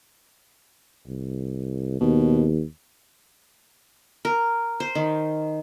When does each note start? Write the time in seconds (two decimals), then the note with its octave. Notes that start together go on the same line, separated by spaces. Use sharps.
1.08 C2
2.01 D#2 B2
4.25 A#4
4.80 C5
4.95 D#3